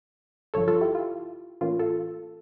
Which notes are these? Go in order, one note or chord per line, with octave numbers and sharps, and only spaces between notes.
G1 G2 F3 A4 C#5
F4 A4
E4 G4
F4
A2 E3 A#3 C#4 F4
F4 A4